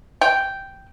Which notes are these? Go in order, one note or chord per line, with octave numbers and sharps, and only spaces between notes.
G5